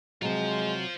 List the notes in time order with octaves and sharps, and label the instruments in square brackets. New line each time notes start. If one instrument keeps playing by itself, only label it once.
[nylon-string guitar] C3 F#3 [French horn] G#3 [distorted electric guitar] F4 C5